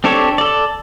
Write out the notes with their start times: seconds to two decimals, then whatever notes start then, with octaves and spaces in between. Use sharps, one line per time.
0.04 C4 D4 G4 A4 C#5
0.38 A4 D5